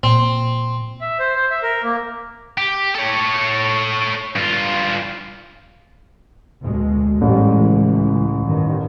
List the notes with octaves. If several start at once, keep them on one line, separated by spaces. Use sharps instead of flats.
A#2 C4
E5
C5
C5
E5
A#4
A#3
G4
A4 C#5
G2 F4
D2 B2 G#3
A1 G#2 G3 G#3
C#2 E3
G2 D#3